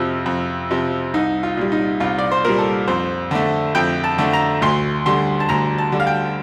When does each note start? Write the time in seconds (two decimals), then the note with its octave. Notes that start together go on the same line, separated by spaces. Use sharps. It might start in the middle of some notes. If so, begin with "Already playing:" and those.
Already playing: F2 C3 F3 F4
0.26 F2
0.71 C3 F3
1.14 C2 D#4
1.43 F4
1.57 A#2 G3
1.72 D#4
2.00 C2 F4
2.18 D5
2.31 C5
2.45 A#2 G3 A#4
2.58 A4
2.87 F2 C5
3.31 D3 A3
3.75 F2 G5
4.04 A5
4.18 D3 A3
4.33 A#5
4.62 D2 C6
5.06 D3 G3 C6
5.40 A5
5.49 D2 A#5
5.78 A5
5.92 D3 G3
6.00 F5
6.07 G5